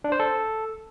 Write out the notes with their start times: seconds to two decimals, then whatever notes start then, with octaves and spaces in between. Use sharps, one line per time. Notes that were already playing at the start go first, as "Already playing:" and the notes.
0.04 D4
0.12 C5
0.20 A4